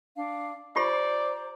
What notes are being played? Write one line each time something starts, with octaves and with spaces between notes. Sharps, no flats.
D4 F5
F4 G4 C5 D5 A#5 B5